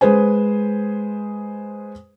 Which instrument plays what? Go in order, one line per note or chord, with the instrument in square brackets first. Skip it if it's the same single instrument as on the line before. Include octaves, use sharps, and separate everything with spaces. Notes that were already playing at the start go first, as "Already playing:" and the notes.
[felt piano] G#3 G#4 B4 C5 G#5